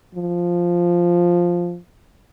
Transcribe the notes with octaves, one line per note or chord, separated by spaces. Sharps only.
F3